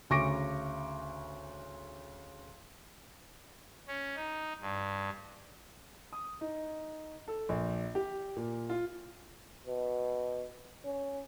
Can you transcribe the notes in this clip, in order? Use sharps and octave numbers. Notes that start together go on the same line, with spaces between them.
D2 C#3 C#6 D6 A#6 D7
C#4
D#4
G2
D#6
D#4
A4
A#1
G4
A#2
F4
B2
C#4